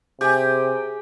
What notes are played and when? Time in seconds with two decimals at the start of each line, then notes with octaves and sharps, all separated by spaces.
0.21 C3 G4 G#4